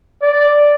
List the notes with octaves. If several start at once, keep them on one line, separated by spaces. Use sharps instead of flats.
D5